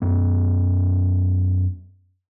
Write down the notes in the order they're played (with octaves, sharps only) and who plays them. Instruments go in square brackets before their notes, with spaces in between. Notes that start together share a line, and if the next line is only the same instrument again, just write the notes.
[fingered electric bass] F#2 B3